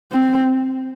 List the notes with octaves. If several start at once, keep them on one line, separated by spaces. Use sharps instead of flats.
C4